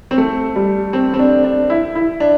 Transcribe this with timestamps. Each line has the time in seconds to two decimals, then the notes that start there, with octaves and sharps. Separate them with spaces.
0.11 C4
0.18 A3
0.56 G3
0.93 C4
1.14 C4
1.19 D4
1.44 D4
1.70 E4
1.95 E4
2.20 D4